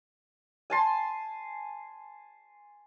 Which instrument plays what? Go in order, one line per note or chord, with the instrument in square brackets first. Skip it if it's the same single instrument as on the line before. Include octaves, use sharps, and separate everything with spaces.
[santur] G#5 A5 C6